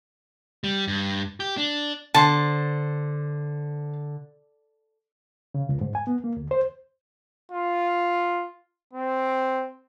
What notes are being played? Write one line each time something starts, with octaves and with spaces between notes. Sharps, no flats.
G3
G2
G4
D4
D3 C5 A5
C#3
C#2
G#2
G#5
B3
A#3
D2
C5
F4
C4